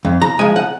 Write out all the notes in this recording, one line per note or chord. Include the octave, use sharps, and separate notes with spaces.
F2
A#5
F3 G#3 G#5
F#5